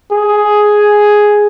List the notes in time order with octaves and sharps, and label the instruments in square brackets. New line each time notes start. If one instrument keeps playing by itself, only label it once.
[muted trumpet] G#4